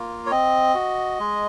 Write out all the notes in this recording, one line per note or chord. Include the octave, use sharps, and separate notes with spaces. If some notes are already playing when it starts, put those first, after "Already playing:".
Already playing: A#3 F4
C#5
C4 D#5
F#4
G#3